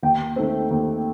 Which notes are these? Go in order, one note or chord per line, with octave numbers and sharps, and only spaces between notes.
D#2 G5
D#3 A3 C4
D#2